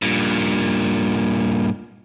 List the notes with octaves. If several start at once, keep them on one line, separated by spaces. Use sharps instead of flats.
G2 A#2